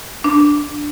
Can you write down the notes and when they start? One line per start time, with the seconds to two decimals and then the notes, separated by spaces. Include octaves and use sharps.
0.24 D4